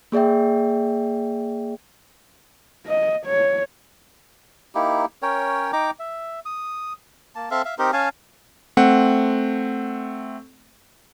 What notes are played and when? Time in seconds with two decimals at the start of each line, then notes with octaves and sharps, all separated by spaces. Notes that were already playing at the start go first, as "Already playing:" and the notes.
0.12 A#3 G#4 D5 E5 G5
2.86 D#5
3.26 C#5
4.75 A#3 D#4 E4 G4
5.22 C#4 A#4 C#5 G5
5.73 D#4 G5 A#5 D6
5.99 E5
6.45 D#6
7.35 A#3 A5
7.51 C4 A4 E5 F5
7.65 E5 F5
7.78 C4 D#4 G4 A#4
7.93 C#4 F5 G#5 A5
8.77 A3 C4 F#5